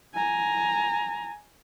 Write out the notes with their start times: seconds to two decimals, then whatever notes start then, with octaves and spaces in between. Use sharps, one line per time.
0.15 G#5 A#5